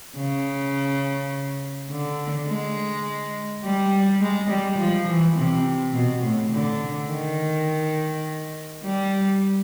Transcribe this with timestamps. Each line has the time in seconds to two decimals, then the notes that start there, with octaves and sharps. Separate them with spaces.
0.17 C#3
1.90 D3
2.47 G#3
3.63 G3
4.21 G#3
4.50 G3
4.79 F3
5.08 E3
5.36 C3
5.93 B2
6.23 A2
6.52 D3
7.10 D#3
8.83 G3